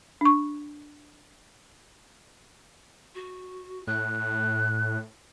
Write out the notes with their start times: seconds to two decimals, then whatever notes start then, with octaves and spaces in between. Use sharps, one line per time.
0.21 D4 C#6
3.16 F#4
3.87 A2 F#6